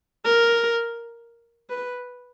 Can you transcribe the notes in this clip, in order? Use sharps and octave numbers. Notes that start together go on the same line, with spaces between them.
A#4
B4